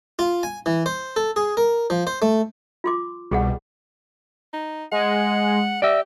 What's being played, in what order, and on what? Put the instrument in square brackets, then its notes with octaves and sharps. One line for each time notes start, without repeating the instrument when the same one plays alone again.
[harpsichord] F4
G#5
E3
C5
A4
G#4
A#4
F3
C5
A3
[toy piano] F4 C6 D6
[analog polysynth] C2 B2 G3 [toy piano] G4 G#4 F#5
[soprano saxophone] D#4
[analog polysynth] G#3 [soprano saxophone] F#5
[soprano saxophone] G4 [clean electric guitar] D5 E5